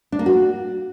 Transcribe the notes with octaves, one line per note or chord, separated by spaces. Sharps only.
D4
A#3
F#4